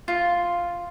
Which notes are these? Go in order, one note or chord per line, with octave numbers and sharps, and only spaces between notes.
F4